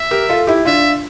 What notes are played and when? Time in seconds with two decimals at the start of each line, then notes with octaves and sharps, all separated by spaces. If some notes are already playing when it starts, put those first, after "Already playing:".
Already playing: E5
0.11 G4 A#4
0.29 F4 A4
0.47 E4 G4
0.65 D4 F4 E5